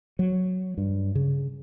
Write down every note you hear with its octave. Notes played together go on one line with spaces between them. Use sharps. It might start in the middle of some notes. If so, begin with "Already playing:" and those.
F#3
G2
C#3